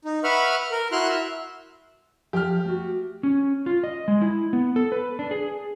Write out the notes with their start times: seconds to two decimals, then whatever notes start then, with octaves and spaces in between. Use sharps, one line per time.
0.05 D#4
0.24 B4 E5 F#5 B5 C#6 F6
0.71 A#4
0.92 E4 F#4 C6 F6 F#6
1.08 E5
2.33 F3 G4 C5 A5 F6
2.65 A3 F#4
3.23 C#4
3.66 F4
3.84 D#5
4.08 G#3
4.22 E4
4.53 B3
4.76 A4
4.92 B4
5.19 D4
5.31 G#4